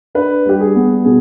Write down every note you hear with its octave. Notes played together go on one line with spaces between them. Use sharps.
D4 B4
G3 G4
G#4
B3
B2 G#4